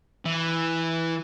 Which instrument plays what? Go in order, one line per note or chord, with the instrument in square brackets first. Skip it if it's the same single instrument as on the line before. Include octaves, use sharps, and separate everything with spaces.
[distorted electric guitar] E3